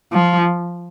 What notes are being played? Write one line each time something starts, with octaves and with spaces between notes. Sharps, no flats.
F3